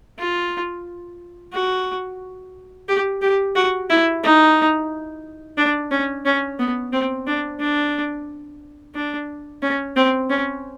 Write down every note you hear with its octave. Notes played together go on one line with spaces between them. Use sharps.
F4
F#4
G4
G4
F#4
E4
D#4
D4
C#4
C#4
B3
C4
D4
D4
D4
C#4
C4
C#4